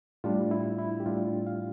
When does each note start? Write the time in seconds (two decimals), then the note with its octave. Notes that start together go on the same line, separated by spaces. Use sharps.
0.24 A2 G3 D4 F4
0.51 E4
0.78 E4
1.00 G4
1.06 A2 G3 D4 F4
1.47 F5